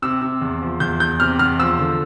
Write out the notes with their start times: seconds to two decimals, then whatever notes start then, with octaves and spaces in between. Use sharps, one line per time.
0.02 C3 E6
0.22 C3
0.42 E2
0.61 F3
0.80 E2 G6
1.00 E2 G6
1.20 C3 F6
1.39 E2 F6
1.59 F3 E6
1.79 D3